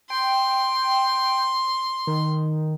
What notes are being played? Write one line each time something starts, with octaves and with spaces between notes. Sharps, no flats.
G5 C6
D#3